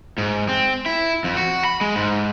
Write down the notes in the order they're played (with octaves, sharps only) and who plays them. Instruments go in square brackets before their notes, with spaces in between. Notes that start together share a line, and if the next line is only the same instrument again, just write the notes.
[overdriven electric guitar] G#2
C4
E4
F2
F#4
B5
G#3
G#2